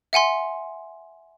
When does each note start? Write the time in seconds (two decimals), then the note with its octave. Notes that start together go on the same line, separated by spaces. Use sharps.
0.13 E5 F#5 G#5 C6